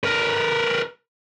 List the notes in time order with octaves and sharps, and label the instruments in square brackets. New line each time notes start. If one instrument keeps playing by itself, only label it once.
[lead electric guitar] A#4 B4